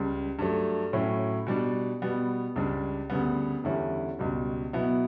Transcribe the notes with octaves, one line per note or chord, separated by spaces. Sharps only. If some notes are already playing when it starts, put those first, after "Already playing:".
Already playing: C#2 C#3 G3
G2 F#3 A3
A2 F#3 C#4 E4
B2 G3 D4
B2 G3 B3
C#2 C#3 G3 D4
D2 C#3 G3 B3
E2 D3 G3 C#4 E4
C#2 B2 G3
B2 F#3 B3 E4